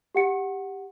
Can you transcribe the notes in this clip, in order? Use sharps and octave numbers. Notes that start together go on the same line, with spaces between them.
G4 F#5 C#7